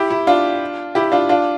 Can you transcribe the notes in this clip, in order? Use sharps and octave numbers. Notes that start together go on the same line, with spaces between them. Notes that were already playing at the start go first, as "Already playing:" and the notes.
Already playing: E4 G4
E4
D4 F4
E4 G4
D4 F4
D4 F4